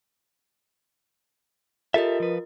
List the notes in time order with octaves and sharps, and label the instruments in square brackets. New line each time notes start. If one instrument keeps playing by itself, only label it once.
[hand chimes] F4 A#4 D#5 [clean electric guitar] G4 A4 E5
[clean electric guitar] F3 B4